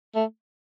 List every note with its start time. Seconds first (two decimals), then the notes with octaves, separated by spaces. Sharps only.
0.16 A3